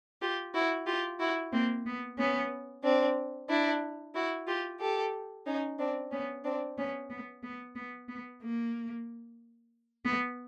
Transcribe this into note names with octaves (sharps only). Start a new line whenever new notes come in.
F4 G4
E4 F#4
F4 G4
E4 F#4
A#3 C4
B3
B3 C#4
C4 D4
D4 E4
E4 F#4
F4 G4
G4 A4
C#4 D#4
C4 D4
B3 C#4
C4 D4
B3 C#4
B3
B3
B3
B3
A#3
B3